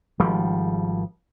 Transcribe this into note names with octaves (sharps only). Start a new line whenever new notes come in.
G#1 F3 G3